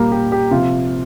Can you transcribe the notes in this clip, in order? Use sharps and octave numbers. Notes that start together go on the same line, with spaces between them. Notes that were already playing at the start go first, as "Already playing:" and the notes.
Already playing: A#2 G3 A#3 G4 A#4
G4
G4
C3 F3 F4